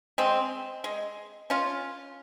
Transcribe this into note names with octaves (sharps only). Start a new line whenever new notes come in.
G#3 C4
G#3
C#4 F4